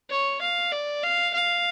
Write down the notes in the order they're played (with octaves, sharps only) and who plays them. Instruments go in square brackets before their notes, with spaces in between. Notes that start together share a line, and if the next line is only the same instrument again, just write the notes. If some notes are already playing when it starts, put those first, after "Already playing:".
[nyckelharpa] C#5
F5
D5
F5
F5